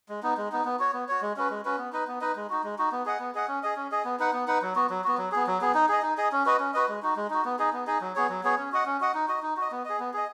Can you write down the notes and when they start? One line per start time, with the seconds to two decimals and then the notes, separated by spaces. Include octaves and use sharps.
0.09 G#3
0.23 B3 D#4
0.37 G#3
0.52 B3 D#4
0.65 B3
0.79 F#4 C#5
0.93 B3
1.08 F#4 C#5
1.22 G#3
1.37 C#4 F#4 B4
1.50 G#3
1.65 C#4 F#4 B4
1.78 B3
1.93 D#4 B4 D#5
2.08 B3
2.21 D#4 B4 D#5
2.36 G#3
2.50 D#4 F#4
2.64 G#3
2.78 D#4 F#4
2.92 B3
3.05 G#4 D#5 F#5
3.20 B3
3.35 G#4 D#5 F#5
3.48 C#4
3.63 G#4 D#5
3.76 C#4
3.92 G#4 D#5
4.05 B3
4.20 D#4 B4 F#5
4.33 B3
4.48 D#4 B4 F#5
4.62 F#3
4.75 B3 F#4
4.90 F#3
5.04 B3 F#4
5.18 F#3
5.32 B3 G#4
5.47 F#3
5.61 B3 G#4
5.75 D#4
5.89 G#4 D#5
6.03 D#4
6.17 G#4 D#5
6.32 C#4
6.45 F#4 B4 D#5
6.60 C#4
6.74 F#4 B4 D#5
6.88 G#3
7.03 D#4 F#4
7.16 G#3
7.30 D#4 F#4
7.45 B3
7.59 D#4 G#4 D#5
7.73 B3
7.87 D#4 G#4 D#5
8.01 F#3
8.15 B3 G#4 C#5
8.30 F#3
8.44 B3 G#4 C#5
8.58 C#4
8.72 F#4 D#5 F#5
8.86 C#4
9.00 F#4 D#5 F#5
9.14 D#4
9.28 F#4 D#5
9.43 D#4
9.57 F#4 D#5
9.72 B3
9.85 G#4 D#5
10.00 B3
10.14 G#4 D#5